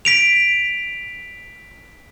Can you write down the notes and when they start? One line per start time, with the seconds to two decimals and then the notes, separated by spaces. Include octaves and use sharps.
0.05 B6 D7 F7